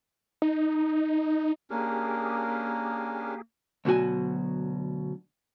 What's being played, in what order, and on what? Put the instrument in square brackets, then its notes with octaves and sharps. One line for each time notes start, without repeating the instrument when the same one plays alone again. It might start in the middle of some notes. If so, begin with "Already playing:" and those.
[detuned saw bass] D#4
[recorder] A#3 [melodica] C#4 D4 A#4 [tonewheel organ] G4 G#4
[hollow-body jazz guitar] D2 B2 F#3 F#4 G#5